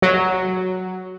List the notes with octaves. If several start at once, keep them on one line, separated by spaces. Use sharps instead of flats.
F#3